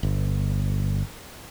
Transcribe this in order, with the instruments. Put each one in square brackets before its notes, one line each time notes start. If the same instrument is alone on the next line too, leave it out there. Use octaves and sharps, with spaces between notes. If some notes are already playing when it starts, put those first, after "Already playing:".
[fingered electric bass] G1